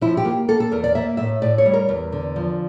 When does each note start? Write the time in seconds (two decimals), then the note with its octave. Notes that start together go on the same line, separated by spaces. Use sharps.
0.01 F3 E4
0.17 G4
0.25 A#3
0.48 A#3 A4
0.60 A4
0.72 E2 A#4
0.84 D5
0.95 A#3 E5
1.17 A2 E5
1.42 A2 D5
1.58 C#5
1.66 G3
1.73 A#4
1.89 E2
2.12 D3
2.36 F3